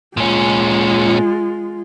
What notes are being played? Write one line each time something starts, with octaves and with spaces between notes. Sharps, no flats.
A#2 G#3 C#4 F4